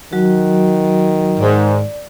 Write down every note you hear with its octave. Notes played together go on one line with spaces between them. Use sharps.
D#3 F#3 F#4
G#2 D5